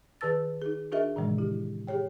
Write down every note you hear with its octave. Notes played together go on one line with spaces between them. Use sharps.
D#3 G#4 B4 A5 E6 A6
D#4 G#4
D4 F#4 G#4 A#4 D#5 E5
A2 C3 D#3 E3 G#3
E4 G4
G4 G#4 C#5 G5